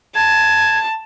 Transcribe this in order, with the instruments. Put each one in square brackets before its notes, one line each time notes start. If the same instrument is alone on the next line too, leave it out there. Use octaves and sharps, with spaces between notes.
[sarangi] A5 [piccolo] G#6